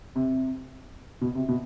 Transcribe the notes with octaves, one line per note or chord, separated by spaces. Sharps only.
C3
B2
C3
B2